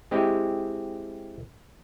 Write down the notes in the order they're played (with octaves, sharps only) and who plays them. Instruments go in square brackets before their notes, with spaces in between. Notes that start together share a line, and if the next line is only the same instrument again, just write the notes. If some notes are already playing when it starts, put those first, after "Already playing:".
[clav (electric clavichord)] G#3 C4 E4 G4 D#5